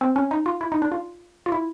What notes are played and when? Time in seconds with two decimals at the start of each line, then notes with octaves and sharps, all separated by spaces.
0.01 C4
0.16 C#4
0.31 D#4
0.46 F4
0.61 E4
0.72 D#4
0.82 D4
0.92 F4
1.46 F4
1.52 E4